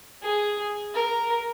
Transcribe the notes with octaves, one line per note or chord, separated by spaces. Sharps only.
G#4
A#4